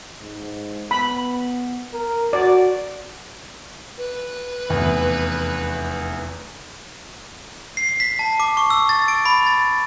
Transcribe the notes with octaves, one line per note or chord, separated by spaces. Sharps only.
G#2
B3 B5
A#4
F#4 D5
B4
F1 E2
C7
B6
A5
D6
C#6
E6
A6
D7
B5
A6